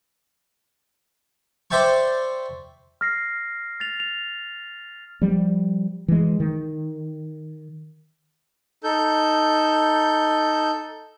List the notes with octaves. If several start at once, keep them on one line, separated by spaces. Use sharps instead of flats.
C5 D5 E5 G5 A5 C#6
F6 A#6 C7
A6 F7
F7
F3 G3
E3 G#3
D#3
D#4 A4 G6